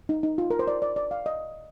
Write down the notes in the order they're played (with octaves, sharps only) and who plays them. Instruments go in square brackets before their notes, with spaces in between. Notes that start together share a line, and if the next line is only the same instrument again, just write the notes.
[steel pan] D#4
D#4
F4
A#4
C5
D5
D5
D5
F5
D#5